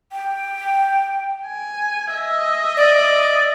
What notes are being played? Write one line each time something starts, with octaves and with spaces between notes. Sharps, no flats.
G5
G#5
D#5 E5
D5